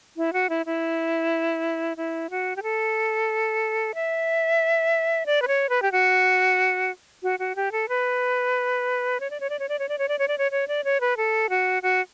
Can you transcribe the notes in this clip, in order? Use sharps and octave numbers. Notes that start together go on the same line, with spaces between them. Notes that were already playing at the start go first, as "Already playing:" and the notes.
E4
F#4
E4
E4
E4
F#4
G4
A4
E5
D5
B4
C#5
B4
G4
F#4
F#4
F#4
G4
A4
B4
C#5
D5
C#5
D5
C#5
D5
C#5
D5
C#5
D5
C#5
D5
C#5
C#5
D5
C#5
B4
A4
F#4
F#4